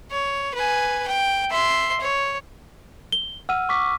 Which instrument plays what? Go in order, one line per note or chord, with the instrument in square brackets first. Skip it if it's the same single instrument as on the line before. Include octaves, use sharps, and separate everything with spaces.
[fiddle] C#5
B4 G#5
G5
E5 C6
C#5
[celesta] G7
[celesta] F#5 [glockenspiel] E6 F6 D#7
[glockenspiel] C#6 D6 B6